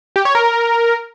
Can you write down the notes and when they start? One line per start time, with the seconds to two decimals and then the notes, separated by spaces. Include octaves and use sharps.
0.16 G4
0.25 C#5
0.35 A#4